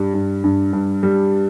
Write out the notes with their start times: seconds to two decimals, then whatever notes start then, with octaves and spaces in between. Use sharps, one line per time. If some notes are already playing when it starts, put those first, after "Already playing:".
Already playing: G2 G3
0.14 G2
0.44 G2
0.73 G2
1.03 G3